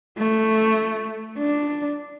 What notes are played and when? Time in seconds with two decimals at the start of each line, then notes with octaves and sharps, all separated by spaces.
0.18 A3
1.39 D4